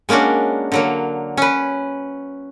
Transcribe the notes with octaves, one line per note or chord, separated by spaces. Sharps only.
G#3 A#3 C#4 D4 F#4
D3 F#3 A#3
C#4 B4